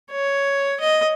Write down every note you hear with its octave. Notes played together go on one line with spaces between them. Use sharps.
C#5
D#5